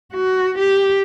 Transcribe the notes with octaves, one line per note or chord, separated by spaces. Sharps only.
F#4
G4